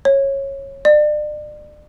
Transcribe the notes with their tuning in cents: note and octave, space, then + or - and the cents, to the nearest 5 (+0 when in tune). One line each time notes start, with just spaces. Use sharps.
C#5 -15
D5 +35